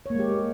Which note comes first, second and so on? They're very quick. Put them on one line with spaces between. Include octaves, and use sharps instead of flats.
C#5 A#3 G#3 G4